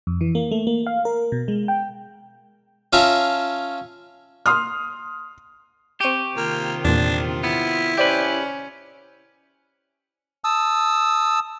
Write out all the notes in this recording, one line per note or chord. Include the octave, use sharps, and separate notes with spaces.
F2
E3
A#3
A3
A#3
F5
A#4
B2
G#3
G5
C#4 F4 C#5 E5 A5 A#5
C6 D#6 F6
C4 G4 C#6 D#7
C3 D#3 A#3 F4
E2 A#2 D4
B3 E4
C#4 G4 B4 C5 D5 D6
A5 D#6 E6